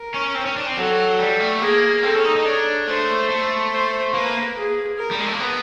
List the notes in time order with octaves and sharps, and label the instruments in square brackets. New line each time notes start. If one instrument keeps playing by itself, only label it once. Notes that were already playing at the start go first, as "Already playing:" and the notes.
Already playing: [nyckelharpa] A#4
[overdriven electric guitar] C#4
C4
C#4
D4
C4
[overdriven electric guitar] F#3 [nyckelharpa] A4
[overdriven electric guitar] G3
A3
[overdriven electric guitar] A#3 [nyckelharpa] G#4
[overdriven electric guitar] C4 [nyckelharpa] A4
[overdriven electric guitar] C#4
D#4
D#4
[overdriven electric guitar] D4 [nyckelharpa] C#5
[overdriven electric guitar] A3 [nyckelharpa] C5
[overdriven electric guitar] A3
[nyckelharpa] C5
[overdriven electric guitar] A#3 [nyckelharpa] B4
[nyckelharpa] G#4
A#4
[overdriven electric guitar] G3
G#3
A3
A#3
B3